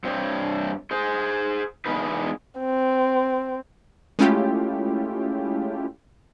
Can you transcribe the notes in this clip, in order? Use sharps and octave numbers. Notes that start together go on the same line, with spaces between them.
G2 C4 C5 C#5
G#4 C5
E2 C#3 G#3 B3 D#4 B4
C4
G#3 A3 C#4 E4 F4 G4